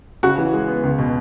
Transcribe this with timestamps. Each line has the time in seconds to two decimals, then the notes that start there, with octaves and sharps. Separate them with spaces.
0.23 C#3 F#4
0.38 E3
0.53 G#3
0.68 B3
0.83 C#2
0.99 B2